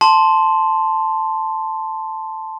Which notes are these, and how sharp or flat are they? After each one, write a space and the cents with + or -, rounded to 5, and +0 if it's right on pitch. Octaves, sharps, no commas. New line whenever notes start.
A5 +0 C6 +0